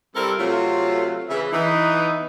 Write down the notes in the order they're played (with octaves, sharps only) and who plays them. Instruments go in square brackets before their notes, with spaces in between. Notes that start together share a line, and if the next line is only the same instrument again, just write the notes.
[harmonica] G3 C4 [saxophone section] E4 A4 A#4
[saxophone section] C3 F#3 A3 [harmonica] F4
[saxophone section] C#3 [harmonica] B4 E5
[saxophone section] E3 [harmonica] B3 D#4